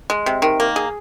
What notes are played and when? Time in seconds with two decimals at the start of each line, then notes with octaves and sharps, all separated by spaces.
0.10 G#3
0.26 C3
0.42 D#3
0.60 A#3
0.76 G#4